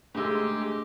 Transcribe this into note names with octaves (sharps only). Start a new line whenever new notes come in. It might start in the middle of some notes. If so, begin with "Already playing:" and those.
G#2 G#3 A3 D4 G4 G#4 E6